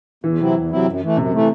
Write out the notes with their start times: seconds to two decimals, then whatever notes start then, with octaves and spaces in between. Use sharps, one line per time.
0.24 E2 E3
0.39 C3 F#3 C4 E4
0.55 E2
0.71 C3 F#3 C4 E4
0.85 F#2
1.02 E3 A3
1.17 F#2 C3
1.33 E3 A3